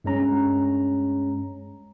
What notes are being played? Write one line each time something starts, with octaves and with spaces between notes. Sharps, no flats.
G2 G#3 C#4 A#5